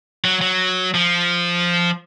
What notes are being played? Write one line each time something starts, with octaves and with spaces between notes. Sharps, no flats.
F#3
F#3
F3